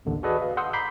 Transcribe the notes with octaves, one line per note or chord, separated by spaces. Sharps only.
A1 D#2 D3
F#4 G#4 A4 B4 D5 D#5
F5
F#5 C6 D#6 E6 G6
A#5 B5 D6 G6 B6 C7